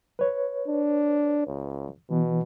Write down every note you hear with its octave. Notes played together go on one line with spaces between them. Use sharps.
B4 C#5
D4
C#2
B2 E3 B3